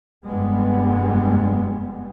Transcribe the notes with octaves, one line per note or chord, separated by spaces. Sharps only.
F1 G2 G3 G#3 B3